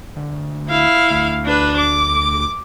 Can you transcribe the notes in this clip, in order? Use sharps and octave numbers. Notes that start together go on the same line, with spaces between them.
D2
E4 F5
D2
D4 B4
D6